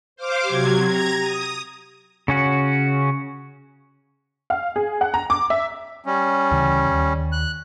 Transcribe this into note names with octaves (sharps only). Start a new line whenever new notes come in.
C5 F5 D6
C3 F#3 G4 G#6
A#5 G#6 A#6
D#6
C#3 C#4 F#4
F5
G#4
F#5
A#5
D6
E5
G3 C#4
D2 C#3 E3
D#2
F#6